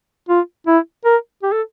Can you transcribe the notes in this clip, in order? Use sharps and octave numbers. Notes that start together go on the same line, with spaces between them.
F4
E4
A#4
G4
A4